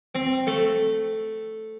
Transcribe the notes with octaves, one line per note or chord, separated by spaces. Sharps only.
C4
A3